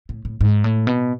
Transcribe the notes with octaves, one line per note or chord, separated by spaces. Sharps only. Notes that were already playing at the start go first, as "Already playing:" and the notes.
A2
A2
G#2
A2
B2